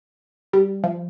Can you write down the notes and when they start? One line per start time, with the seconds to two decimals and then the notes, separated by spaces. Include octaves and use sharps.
0.53 G3
0.84 F3